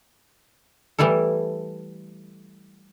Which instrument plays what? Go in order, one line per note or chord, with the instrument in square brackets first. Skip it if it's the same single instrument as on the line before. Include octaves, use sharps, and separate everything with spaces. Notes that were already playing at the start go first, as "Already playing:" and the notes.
[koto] E3 G3 A3 E4 A4